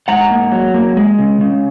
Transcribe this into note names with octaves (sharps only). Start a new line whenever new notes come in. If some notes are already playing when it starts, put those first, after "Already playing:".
G#2 F#5 A#5
A#3
F#3
A#3
G#3
C#3
C#3